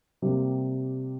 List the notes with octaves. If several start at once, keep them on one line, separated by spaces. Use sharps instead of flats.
C3 G3 A#3